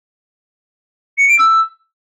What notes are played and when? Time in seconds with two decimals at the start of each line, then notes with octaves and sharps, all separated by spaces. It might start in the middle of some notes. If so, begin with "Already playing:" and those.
1.18 C#7
1.28 D7
1.39 E6